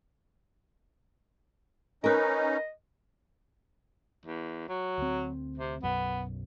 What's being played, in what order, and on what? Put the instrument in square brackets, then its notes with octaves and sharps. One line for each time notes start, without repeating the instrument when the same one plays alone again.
[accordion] C#4 D#4 [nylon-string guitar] A#4 B4 [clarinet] D#5
[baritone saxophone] E2
F#3
[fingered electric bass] D2 C4
[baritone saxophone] C3
[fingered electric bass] B1 F#2 [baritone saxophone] B3